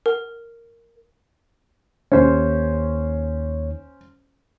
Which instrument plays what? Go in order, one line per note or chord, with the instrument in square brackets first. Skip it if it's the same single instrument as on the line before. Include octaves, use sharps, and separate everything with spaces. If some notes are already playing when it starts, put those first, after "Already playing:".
[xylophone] A#4
[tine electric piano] D#2 C#5 [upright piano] C#4 C5